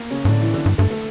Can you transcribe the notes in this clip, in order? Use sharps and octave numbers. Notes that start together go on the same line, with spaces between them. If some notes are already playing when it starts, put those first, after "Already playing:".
Already playing: A#3
C#3 C#4
G2
A2 D3 D4
E3 E4
D3 D4
G2
G2 A3
A3